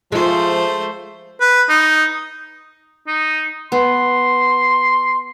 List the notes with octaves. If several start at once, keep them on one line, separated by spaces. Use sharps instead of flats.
F3 G#3 A3 F4 C5
B4
D#4
D#4
B3 C6